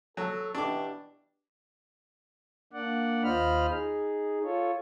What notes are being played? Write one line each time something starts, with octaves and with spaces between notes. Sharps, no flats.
F#3 A4
B2 E3 D4 G4 D6
A#3 D4 D5 F#5
D#2 F4 C5 D#5 B5 F6
D#4 G#4
F4 A4 C#5